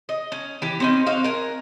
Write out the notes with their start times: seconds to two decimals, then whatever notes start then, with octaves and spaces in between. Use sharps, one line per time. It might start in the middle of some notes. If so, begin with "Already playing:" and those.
0.09 D#5
0.32 C#4
0.62 E3 G4
0.80 C4 C#4 D#4
1.06 F#4 C5 D#5 F5
1.24 A#4 G#5